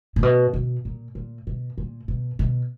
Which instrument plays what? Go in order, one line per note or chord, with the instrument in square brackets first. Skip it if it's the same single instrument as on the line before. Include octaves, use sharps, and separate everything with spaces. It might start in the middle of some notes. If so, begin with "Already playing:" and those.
[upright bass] A#2
B2
B2
A#2
A#2
B2
A#2
B2
B2